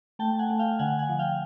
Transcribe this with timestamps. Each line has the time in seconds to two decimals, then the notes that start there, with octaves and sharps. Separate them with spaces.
0.19 A3 G5 A5
0.39 F#5 G#5
0.50 A3
0.59 F5 G5
0.79 D3 F#5 G#5
0.99 F#5 G#5
1.09 F3
1.19 F5 G5